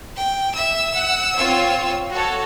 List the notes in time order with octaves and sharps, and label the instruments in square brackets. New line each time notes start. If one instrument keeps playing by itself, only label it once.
[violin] G5
[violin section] E5 [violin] E6
[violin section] F#5
C4 F4 C#5
F#4 A4 C#5